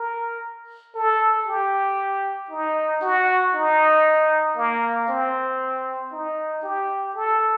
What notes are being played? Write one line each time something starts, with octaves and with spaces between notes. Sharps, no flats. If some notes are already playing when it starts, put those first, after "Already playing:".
Already playing: A#4
A4
G4
D#4
F#4
D#4
A#3
C4
D#4
G4
A4